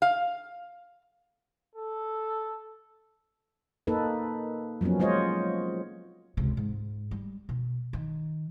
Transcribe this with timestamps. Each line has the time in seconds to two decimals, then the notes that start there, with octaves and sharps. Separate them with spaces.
0.02 F5
1.75 A4
3.87 A#3 D#4 A4 B4
4.81 F3 F#3 A#3 B3 C#4
5.00 G#3 F4 C5 C#5 D#5
6.37 C#2 C3
6.57 G#2
7.11 G3
7.49 B2
7.93 D#3